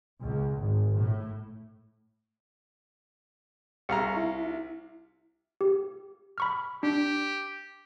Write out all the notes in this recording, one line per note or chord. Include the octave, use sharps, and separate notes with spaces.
C#2
G#1
A2
C2 F5 A#5 C#6
E4
G4
B5 C#6 F6
D4 G4